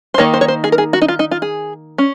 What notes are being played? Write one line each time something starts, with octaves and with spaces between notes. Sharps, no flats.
C5
D#3 A#3 D#4 C#5
C5
C#5
C5
G#4
A#4
G#4
F#4
D#4
F4
D#4
F4
G#4
C#4